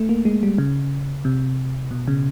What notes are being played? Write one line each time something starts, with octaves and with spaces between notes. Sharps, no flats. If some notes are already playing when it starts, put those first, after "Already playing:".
Already playing: A3
A#3
G#3
G3
C#3
C3
B2
C#3